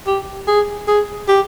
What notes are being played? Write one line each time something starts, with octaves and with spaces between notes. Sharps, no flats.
G4
G#4
G#4
G4